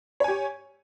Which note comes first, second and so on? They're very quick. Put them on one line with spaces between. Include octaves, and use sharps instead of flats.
C#5 G#5 G4